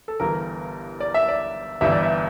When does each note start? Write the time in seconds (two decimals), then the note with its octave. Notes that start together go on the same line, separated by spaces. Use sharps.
0.08 A4
0.20 G1 G2 E3 A#4
1.01 D5
1.14 E5
1.28 D5
1.81 G1 G2 E3 G3 E5
1.92 D5
2.03 E5